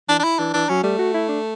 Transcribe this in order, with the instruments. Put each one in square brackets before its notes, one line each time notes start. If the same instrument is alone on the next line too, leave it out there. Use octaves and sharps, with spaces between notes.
[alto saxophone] E3 [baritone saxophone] D4
[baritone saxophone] D4
E4
[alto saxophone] E3 [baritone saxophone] D4
[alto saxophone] E3 [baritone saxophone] D4
[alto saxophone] F#3 [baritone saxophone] C#4
[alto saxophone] G3 [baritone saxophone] A3
[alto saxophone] F#4
E4
D4